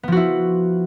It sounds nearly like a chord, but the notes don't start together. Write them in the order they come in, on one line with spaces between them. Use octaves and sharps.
B3 F3 F#4 E4